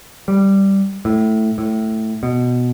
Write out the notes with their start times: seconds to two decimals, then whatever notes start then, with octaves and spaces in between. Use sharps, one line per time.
0.28 G3
1.05 A2
1.58 A2
2.23 B2